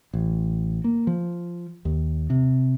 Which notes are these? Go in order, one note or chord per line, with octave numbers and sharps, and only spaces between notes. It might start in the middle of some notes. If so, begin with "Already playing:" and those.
A1
A#3
F3
D#2
C3